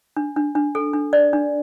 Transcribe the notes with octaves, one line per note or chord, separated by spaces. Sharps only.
D4
D4
D4
A4
D4
D5
D4